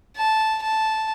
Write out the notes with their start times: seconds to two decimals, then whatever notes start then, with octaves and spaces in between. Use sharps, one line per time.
0.17 A5
0.63 A5